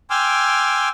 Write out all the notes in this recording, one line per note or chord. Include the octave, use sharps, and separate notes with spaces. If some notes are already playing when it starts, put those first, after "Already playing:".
G5 G#5 C6 D6 E6 F6